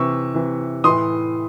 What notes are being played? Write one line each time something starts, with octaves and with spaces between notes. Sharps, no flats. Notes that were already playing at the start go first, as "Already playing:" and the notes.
Already playing: C3 E3 C#6 E6
C3 E3
A2 E3 C6 D#6